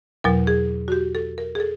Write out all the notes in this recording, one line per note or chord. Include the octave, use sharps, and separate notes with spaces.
E2 B2 F#3 A#4
G#4
F#4
G4
A4
A#4
G#4
A4